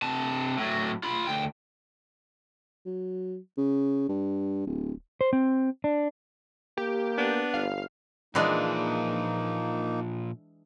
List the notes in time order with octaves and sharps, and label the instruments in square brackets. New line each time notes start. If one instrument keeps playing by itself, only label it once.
[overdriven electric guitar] C3 A5
A2 F#3
F4 B5
D2 G5
[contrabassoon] F#3
C#3
G2
D1
[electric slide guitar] C5
C4
D4
[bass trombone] A#3 [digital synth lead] G4
[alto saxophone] B3 [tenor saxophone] D4
[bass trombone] G1 [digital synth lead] F5
[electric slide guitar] A#2 F3 [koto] E3 G#3 D4 [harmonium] A#3 D#4